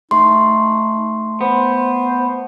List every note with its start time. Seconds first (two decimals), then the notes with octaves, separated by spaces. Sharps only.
0.11 A3 D#4 C6
1.41 B3 C5